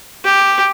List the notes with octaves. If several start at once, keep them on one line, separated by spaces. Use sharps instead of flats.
G4